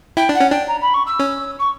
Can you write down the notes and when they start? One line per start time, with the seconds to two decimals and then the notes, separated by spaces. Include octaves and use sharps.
0.17 E4 G5
0.29 D4
0.35 F#5
0.40 C#4
0.51 D4 G5
0.68 A#5
0.82 B5
0.94 C#6
1.06 E6
1.19 C#4
1.59 C#6